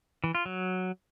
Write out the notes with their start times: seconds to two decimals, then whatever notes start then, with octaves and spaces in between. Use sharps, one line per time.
0.24 E3
0.35 F4
0.46 F#3